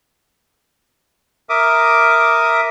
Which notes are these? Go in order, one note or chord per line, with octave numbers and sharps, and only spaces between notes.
A#4 E5 D6 D#6